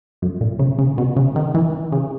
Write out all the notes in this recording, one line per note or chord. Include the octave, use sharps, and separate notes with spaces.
F#2
A#2
C#3
C#3
B2
C#3
D#3
E3
C#3